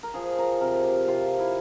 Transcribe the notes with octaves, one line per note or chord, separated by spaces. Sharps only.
A#4
F3 G#4
A#4
C3 A#4
G4
C3 F4
E4